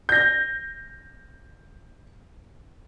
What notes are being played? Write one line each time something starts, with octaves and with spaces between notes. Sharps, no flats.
G6 A#6